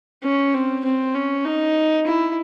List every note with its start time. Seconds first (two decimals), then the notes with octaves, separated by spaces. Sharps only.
0.23 C#4
0.54 C4
0.84 C4
1.14 C#4
1.45 D#4
2.06 E4